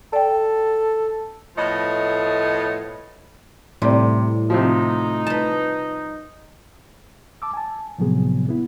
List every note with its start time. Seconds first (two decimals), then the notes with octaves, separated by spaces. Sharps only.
0.13 A4 D5 G5
1.56 A2 F3 A3 B3 C#5 D#5
3.82 A2 C3 G3
4.50 C3 F3 D#4
5.27 B4 A5
7.42 A5 D6 E6
7.53 G#5 A5
7.98 A2 C3 F3 F#3 B3 G#4
8.49 B3 E4